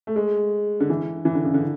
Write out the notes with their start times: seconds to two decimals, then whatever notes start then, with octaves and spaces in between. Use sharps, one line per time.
0.07 A3
0.16 G#3
0.80 D3
0.90 E3
1.25 E3
1.35 D3
1.45 C#3
1.54 D3